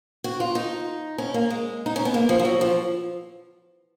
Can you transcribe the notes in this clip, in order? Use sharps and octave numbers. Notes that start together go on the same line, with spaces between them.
F#4
F4
D#4
C#4
A#3
G#3
D#4
C#4
B3
A#3
F3
F3
F#3
F3